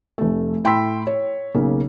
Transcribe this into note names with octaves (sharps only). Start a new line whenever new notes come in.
F1 A3
A2 G5 B5 C6 E6 B6
C#5
B1 C#3 A#3